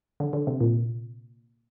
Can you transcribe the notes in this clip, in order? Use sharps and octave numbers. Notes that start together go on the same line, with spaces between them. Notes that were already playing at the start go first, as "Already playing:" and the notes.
D3
D3
C3
A#2